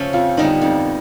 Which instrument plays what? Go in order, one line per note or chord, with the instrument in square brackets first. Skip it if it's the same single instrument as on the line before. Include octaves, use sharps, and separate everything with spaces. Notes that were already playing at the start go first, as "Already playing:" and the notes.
Already playing: [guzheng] C#3 F3 A3 C#4
[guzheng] F2 [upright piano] F4
[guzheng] D3 G3 B3 [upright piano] D#4
[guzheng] F2 [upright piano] D#4